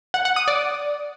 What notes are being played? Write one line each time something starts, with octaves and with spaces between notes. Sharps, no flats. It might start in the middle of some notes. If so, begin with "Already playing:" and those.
F#5
F#5
D#6
D5